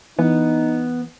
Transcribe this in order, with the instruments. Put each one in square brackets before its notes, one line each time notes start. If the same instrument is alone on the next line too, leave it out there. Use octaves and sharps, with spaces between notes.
[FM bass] E3 [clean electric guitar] B3 [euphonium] D#4